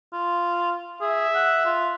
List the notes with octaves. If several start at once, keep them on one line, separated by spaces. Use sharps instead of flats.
F4
G#4 E5
F#5
F4